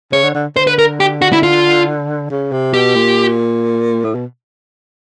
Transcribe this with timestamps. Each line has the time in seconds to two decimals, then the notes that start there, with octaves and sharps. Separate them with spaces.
0.12 C#3 C#5
0.23 D3
0.35 D3
0.56 D3 C5
0.67 B4
0.79 A#4
1.00 G4
1.22 F#4
1.33 E4
1.43 F4
2.30 C#3
2.52 C3
2.74 B2 G4
2.96 A#2
4.05 A2
4.15 B2